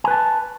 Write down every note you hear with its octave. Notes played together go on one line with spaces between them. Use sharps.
B4 G#5 A5